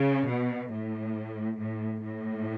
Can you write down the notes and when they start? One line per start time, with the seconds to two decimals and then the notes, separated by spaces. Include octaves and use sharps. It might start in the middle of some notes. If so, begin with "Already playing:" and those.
Already playing: C#3
0.28 B2
0.71 A2
1.58 A2
2.01 A2